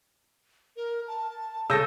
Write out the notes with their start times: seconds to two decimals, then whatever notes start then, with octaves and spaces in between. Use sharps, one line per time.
0.77 A#4
1.08 A5
1.70 C#3 A4 E6 G6 A#6